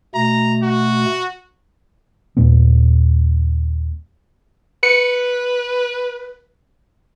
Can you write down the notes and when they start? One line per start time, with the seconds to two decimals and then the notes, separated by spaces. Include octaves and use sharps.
0.15 B2 A3 A#5
0.62 F#4
2.37 D#2 A#2 G#3 B3
4.83 B4 C#7